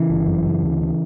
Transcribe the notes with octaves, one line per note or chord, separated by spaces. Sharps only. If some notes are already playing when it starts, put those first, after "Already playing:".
Already playing: C#3 E3
G1
F#2
C#3
D2
C#3